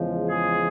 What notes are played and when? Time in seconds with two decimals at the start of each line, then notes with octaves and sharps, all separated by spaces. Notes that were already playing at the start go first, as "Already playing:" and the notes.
Already playing: E2 C#3 F3 G#3
0.27 G#4